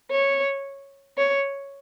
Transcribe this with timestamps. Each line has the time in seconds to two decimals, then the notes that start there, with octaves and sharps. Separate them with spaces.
0.11 C#5
1.18 C#5